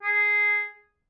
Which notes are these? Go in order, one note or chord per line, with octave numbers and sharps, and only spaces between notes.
G#4